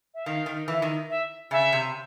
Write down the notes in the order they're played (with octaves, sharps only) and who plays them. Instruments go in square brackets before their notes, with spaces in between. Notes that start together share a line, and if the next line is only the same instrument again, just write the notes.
[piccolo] E5
[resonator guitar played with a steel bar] D#3 [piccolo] F5
[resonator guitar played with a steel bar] D#3
E3
D#3
[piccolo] E5
[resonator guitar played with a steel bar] C#3 [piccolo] E5
[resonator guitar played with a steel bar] C3